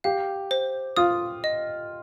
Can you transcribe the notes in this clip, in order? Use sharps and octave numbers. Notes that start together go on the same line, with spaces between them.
G4 F5
C5
F4 D#6
D#5